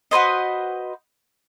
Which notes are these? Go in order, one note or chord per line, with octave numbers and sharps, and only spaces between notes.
F#4 B4 C5 D#5